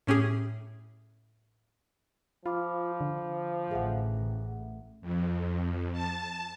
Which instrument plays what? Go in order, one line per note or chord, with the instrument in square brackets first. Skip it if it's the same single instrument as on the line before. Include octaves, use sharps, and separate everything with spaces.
[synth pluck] A2 C#4 G4 G#4
[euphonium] F3 [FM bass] F4 [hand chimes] B5 D6 F6
[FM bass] D3
[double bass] A1 A2 [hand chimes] G#4 E5 F#5
[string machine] F2
A5